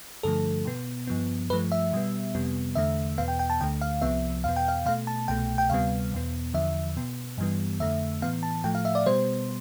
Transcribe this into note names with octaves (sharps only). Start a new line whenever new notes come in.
G2 D3 F3 A3 A4
B2 B3
G2 F3 B3
G2 F3 A3 B4
E5
B2 G3 B3
F2 C3 G3 B3
E2 D3 A3 E5
E2 B2 B3 F5
G5
G5
A5
D2 D3 A3 G5
F5
C2 C3 F3 B3 E5
E2 B2 B3 F5
G5
F5
B2 A3 F5
A5
C2 B2 A3 G5
G5
D2 C3 G3 B3 F5
E2 B2 B3
E2 D3 F3 E5
B2 B3
G2 E3 G3 B3
F2 D3 A3 E5
A2 E3 B3 F5
A5
A2 F3 A3 G5
F5
E5
D5
B2 G3 B3 C5